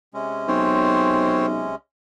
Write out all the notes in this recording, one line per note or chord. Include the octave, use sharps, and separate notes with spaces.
C3 G#3 C#4
B1 C4 C5 C#5